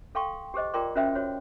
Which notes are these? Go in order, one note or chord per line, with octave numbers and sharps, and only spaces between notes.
A4 F5 G5 C6 C#6
G4 G#4 C5 D#5
F4 A#4 D5 G5 C6 D6
C#4 F#4 A#4 C5 E5 G5
F#4 C5 C#5